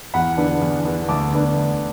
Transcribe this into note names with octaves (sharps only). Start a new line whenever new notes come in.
E2 F#5 B5
D3 B3 D4
E2
D3 B3 D4
D2 A5 D6
D3 B3 D4
D2